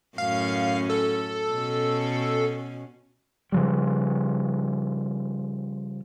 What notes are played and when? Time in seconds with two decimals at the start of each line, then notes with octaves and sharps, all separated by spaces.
0.18 F#2 A2 C#4 F5
0.90 A4
1.53 B2 C#4
3.52 C#3 F3 G3